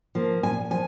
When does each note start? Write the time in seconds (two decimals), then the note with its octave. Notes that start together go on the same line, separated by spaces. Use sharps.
0.15 F3 A#3
0.43 A#2 G#5
0.70 F3 G#5